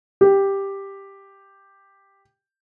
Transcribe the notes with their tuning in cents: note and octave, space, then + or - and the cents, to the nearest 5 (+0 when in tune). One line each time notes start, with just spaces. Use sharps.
G4 +5